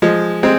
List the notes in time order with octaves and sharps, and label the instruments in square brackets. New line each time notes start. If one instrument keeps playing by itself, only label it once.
[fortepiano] F3 G#3
G#3 C4